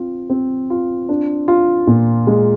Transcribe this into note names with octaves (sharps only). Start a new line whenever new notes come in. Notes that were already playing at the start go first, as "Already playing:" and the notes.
Already playing: C4 F4
C4
F4
D4
F4
A#2
G#3